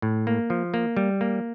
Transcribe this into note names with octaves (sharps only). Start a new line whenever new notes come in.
A2
A#3
F3
A#3
G3
A#3